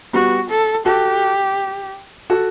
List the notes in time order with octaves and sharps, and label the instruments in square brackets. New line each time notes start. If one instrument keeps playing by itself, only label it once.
[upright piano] G3 B3 [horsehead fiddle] F#4
[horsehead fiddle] A4
[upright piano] F#4 A4 [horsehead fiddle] G4
[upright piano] F#4 A4